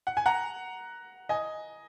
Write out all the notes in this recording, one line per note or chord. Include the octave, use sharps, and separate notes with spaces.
F#5
G#5
F#5 A#5
D#5 G#5